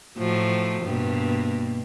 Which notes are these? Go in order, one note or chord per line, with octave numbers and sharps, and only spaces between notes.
A2 F3 F#3
G2 B2 A#3